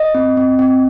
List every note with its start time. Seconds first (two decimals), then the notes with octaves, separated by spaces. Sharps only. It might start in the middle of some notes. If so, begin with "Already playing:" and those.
Already playing: D#5
0.14 C4
0.37 C4
0.59 C4